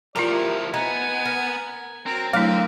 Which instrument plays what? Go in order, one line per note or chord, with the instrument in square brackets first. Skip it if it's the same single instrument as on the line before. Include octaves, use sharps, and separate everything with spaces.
[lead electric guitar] A2 F3 [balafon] F4 A#5 [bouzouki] G4 A#4 [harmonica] D5
[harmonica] E4
[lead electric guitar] B3 [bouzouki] D#4 [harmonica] G#5
[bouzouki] A#4
[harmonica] F#3 A#4 [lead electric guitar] C4
[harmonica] D3 A#4 [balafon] F#3 A3 E4 [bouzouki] F5